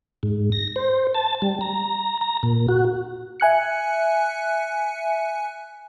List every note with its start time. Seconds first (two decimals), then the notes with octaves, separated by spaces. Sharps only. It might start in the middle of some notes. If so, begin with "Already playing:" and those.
0.23 G#2
0.52 A#6
0.76 C5
1.15 A5
1.42 G3
1.61 A#5
2.21 A#5
2.43 A#2
2.68 F#4
3.40 E5 G#5 F#6 C#7